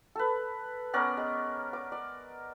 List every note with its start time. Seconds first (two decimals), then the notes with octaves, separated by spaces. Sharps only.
0.16 A4 B4
0.94 B3 C#4 A#4 D5
1.17 G#3
1.73 D6
1.92 D5